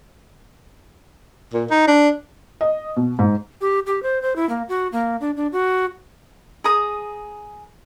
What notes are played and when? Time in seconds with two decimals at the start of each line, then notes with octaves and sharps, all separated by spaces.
1.54 A#2
1.70 D#4
1.88 D4
2.61 D#5
2.96 B2
3.19 G#2
3.61 G4
3.87 G4
4.03 C5
4.22 C5
4.36 E4
4.49 A#3
4.69 F#4
4.92 A#3
5.21 D4
5.37 D4
5.52 F#4
6.64 G#4 A#5 D#6